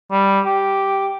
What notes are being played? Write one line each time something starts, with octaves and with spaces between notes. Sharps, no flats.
G3
G4